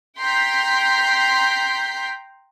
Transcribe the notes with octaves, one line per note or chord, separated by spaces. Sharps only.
G5 A#5 C6 G6 B6